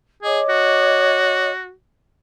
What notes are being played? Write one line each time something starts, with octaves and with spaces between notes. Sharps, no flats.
G#4 C#5 D#5 D6
F#4